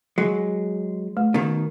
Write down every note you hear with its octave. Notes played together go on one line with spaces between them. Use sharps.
F#3 G#3
A3
B2 D#3